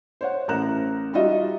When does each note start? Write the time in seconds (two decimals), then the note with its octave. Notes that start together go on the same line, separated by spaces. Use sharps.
0.21 C5 C#5 F#5
0.48 A1 A#4 A#5 F#6 E7
1.13 G3 D#4 F4 F#4 D#5 E5